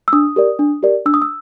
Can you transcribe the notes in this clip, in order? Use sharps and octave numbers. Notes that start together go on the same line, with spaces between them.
E6
D4 D#6
G4 A#4 D5
D4
G4 A#4 D5
D4 E6
D#6
E6